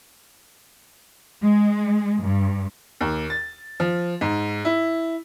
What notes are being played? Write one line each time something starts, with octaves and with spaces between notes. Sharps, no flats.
G#3
G2
D#2
A6
F3
G#2
E4